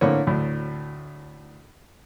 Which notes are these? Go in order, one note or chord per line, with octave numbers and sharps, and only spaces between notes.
A2 D3 A#3 C4 C#5
D2 A2